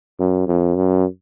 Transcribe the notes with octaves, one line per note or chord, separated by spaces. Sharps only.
F#2
F2
F#2